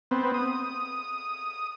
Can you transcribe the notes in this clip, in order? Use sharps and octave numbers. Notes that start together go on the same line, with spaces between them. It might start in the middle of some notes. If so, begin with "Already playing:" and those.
B3 C4
D#6